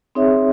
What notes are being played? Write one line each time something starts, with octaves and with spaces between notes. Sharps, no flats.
C4 D#4 G#4 C#5 E5